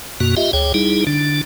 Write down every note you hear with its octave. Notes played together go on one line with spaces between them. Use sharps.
F#2 B2 A#3 F#4
F4 G4 D#5 E5
D2 G#4 C#5 G5
G3 D#4 E4 G#4
D3 D4